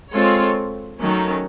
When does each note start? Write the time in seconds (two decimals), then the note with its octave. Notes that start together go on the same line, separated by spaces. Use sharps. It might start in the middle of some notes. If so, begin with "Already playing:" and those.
0.12 G#3 C4 F4 A4 C#5
0.99 D#3 F#3 A3 C#4